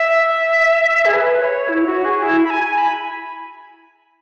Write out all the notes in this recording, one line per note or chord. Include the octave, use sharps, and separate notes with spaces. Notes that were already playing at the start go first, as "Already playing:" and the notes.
Already playing: E5
G#4
B4
C#5
E4
E4
F#4
G#4
E4
B5
G#5
G#5
B5